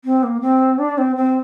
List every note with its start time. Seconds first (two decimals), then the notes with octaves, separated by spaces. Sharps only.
0.05 C4
0.23 A#3
0.41 C4
0.78 D4
0.98 C4
1.16 C4